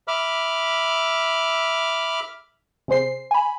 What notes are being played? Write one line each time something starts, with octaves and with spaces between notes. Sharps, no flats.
E5 B5 D6 F6
C3 G#4 C5 C7
G#5 B5